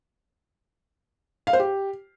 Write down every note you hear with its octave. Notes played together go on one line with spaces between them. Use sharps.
F5
C5
G4